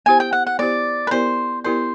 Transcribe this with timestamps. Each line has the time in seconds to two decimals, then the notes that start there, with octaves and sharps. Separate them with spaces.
0.06 B3 E4 G4 C5 G#5
0.20 G5
0.33 F#5
0.47 F#5
0.59 B3 E4 G4 C5 D5
1.07 B4
1.11 B3 E4 G4 A#4 C5 D5
1.64 B3 E4 G4 A#4 C5 D5